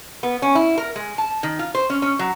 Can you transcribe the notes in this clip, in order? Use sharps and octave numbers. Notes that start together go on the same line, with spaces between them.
B3
C#4
E4
A#4
G#3
A5
D#3
F4
C5
C#4
C#4
F#3